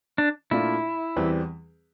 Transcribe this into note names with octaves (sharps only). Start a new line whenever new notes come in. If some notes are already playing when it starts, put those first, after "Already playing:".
D4
A#2 A3 D4 E4 F4
E2 E3 G3 C4